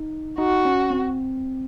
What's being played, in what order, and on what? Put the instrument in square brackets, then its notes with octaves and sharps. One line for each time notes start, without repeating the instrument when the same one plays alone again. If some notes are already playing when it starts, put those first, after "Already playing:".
Already playing: [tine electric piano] D#4
[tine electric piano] D#4 [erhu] F#4
[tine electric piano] C#4
C4